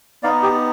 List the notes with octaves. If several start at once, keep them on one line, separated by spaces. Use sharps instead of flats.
B3 D#4 D5 F5
G4